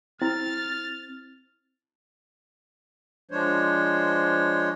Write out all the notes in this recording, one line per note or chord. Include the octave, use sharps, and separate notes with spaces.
C4 E4 F6 A6
F3 G#3 D4 C5 C#5